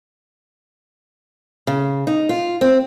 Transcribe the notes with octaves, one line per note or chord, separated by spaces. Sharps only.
C#3
D#4
F4
C4